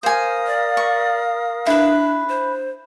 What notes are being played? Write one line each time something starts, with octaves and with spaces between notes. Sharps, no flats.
A#4 C5 F5 G#5 D#6
D5
C#6
D4 E4 B4
C5